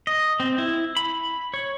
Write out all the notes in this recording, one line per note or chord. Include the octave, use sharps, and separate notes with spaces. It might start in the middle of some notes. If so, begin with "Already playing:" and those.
D#5
C4
E4
B5
C#5